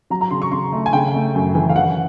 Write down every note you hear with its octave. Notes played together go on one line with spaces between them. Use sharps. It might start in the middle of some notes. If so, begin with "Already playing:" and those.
F#3 A#5
A#5
C#3 C6
C#6
C#3 C6
A3
G#5
C#3 G5
A3
F#2
E3
F5
E3 F#5